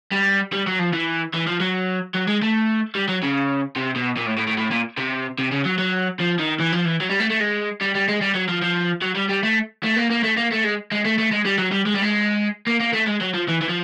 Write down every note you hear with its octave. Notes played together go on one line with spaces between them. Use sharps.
G3
G3
F#3
F3
E3
E3
F3
F#3
F#3
G#3
A3
G3
F#3
C#3
C3
B2
A#2
A2
A2
A2
A2
A#2
C3
C3
C#3
F#3
F#3
F3
D#3
E3
F3
E3
F#3
G3
A3
A3
G#3
G3
G3
G#3
G3
F#3
F3
F3
F#3
G3
G3
A3
A3
A#3
A#3
A3
A#3
A3
G#3
G#3
A3
A3
G#3
G3
F#3
G3
G#3
G3
G#3
A#3
A#3
A3
G#3
F#3
F3
E3
E3
F3